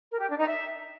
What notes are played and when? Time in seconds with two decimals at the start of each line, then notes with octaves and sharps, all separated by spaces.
0.11 A#4
0.20 G4
0.29 D4
0.38 D#4
0.47 E5